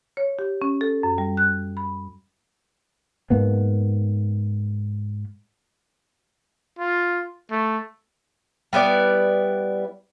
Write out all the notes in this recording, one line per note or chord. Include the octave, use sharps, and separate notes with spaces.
C#5
G4
C#4
A4
F#2
G3
F#6
B5
G#2 A#3 B3
F4
A3
G3 B3 E4 D5